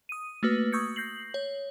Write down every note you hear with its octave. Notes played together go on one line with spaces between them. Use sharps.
D#6 D#7
A3 A#3 F#4 B4
C#6 D#6 E6 G6 G#6 C#7
G6 A#6 C7 F#7
C#5